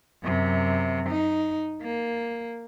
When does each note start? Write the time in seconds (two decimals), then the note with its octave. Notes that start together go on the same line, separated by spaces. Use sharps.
0.23 F#2 C3
1.10 D#4
1.82 A#3